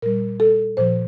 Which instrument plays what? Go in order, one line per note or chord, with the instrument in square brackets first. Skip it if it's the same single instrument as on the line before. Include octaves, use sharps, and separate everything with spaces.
[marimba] A#2 G3 A#4
A4
A#2 F3 C5